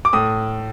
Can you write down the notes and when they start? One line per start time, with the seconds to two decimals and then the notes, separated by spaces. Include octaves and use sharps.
0.05 D6
0.13 A2 D#6